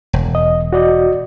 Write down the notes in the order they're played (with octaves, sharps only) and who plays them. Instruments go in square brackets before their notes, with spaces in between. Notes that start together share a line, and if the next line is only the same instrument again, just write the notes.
[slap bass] E1
[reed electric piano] D#5
F#4 D5 D#5